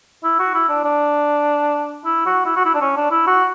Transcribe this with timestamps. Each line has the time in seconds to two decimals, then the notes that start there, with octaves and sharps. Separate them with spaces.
0.24 E4
0.39 F#4
0.54 E4
0.69 D4
0.84 D4
2.05 E4
2.26 F#4
2.46 E4
2.56 F#4
2.65 E4
2.75 D4
2.81 C#4
2.96 D4
3.11 E4
3.27 F#4